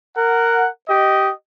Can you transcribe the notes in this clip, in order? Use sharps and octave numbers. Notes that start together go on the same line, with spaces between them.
A#4 F#5
G4 D#5